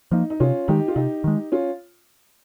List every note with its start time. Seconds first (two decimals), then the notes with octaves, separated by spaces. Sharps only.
0.11 F3 A#3 D#4
0.30 D#4
0.40 C3 C#4 F4
0.68 D#3 G#3 D#4 G4
0.88 F4
0.96 C3 D#4 G4
1.24 D#3 G#3
1.52 C#4 F4